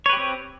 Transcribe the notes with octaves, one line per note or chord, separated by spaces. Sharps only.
C4 G4 B4 C#5